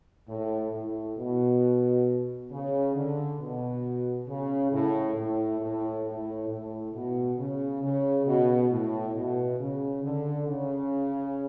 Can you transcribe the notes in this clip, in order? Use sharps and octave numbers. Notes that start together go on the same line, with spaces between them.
A2
A2
B2
C#3
D3
B2
C#3
A2
A2
A2
A2
A2
B2
C#3
C#3
B2
A2
B2
C#3
D3
C#3